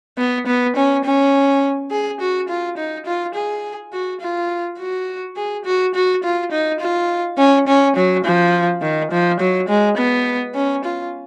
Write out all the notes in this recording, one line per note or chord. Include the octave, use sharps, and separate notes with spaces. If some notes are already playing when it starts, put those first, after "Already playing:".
B3
B3
C#4
C#4
G#4
F#4
F4
D#4
F4
G#4
F#4
F4
F#4
G#4
F#4
F#4
F4
D#4
F4
C#4
C#4
F#3
F3
D#3
F3
F#3
G#3
B3
C#4
F4